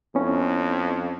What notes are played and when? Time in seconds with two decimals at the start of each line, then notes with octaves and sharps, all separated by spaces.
0.15 F2 B3 C#4 E4